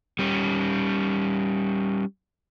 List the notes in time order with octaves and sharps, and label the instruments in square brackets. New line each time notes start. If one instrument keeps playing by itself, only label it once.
[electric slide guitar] G3 C#4